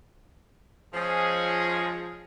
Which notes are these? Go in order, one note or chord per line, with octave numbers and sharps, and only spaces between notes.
F3 G#3 C#4 G#4